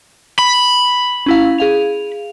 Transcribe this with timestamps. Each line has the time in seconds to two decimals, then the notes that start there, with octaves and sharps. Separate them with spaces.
0.39 B5
1.26 C#4 E4 F5
1.58 G#4 F5 F7